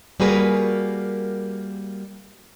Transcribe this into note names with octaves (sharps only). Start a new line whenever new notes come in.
G3 A#3 F#4 G#4 A#4 B4